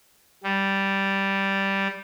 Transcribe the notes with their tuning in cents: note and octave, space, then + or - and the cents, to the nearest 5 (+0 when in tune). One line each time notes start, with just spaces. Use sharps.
G3 -5